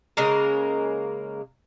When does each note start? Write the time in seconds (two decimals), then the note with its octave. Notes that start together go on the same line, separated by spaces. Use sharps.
0.17 C#3 G#3 A#3 A#4